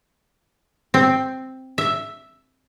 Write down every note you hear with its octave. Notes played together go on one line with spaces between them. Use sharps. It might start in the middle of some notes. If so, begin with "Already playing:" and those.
C4
E5